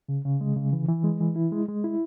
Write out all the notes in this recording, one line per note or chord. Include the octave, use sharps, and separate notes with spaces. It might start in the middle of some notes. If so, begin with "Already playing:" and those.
C#3
C#3
G#3
C#3
E3
E3
G#3
E3
E4
G#3
G#3
E4